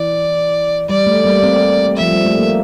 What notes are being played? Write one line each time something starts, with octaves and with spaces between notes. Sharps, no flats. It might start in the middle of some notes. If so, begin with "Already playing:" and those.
Already playing: E3 D5
G3 D5
A3
G3 A#3
A3 C4
F3 E5
G3
A3
A#3